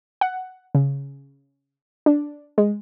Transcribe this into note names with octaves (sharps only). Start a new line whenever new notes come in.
F#5
C#3
D4
G#3